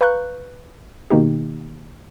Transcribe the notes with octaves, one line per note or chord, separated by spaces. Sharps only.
B4 F5 A#5 C#6 F#6 G6
B2 D#3 A#3 D#4 G4